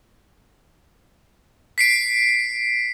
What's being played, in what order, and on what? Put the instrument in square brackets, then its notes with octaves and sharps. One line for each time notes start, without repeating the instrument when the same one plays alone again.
[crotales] B6 C7 D7